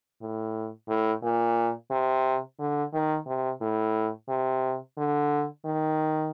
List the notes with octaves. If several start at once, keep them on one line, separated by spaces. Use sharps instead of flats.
A2
A2
A#2
C3
D3
D#3
C3
A2
C3
D3
D#3